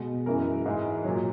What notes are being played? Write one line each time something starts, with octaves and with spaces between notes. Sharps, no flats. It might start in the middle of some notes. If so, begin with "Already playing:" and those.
Already playing: B2 G#3
F#2 E3 G#3 A#4
G#2 E3 G#3
A#2 F#3